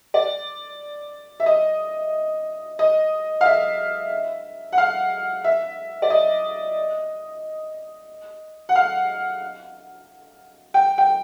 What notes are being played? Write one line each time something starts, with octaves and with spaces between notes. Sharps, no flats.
D5
E5
D#5
D#5
F5
E5
F#5
F5
E5
D5
D#5
F#5
F5
G5
G5